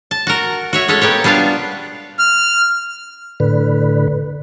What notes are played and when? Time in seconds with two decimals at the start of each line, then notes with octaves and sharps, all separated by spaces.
0.11 A5
0.27 F#4 A#4
0.73 F#4 C#5 E5
0.88 G#3 C#4 A4 C#5 E5
1.01 A#3 B3 G4 C#5
1.24 G3 B3 D4 F4 F5
2.19 F6
3.40 A2 D3 B4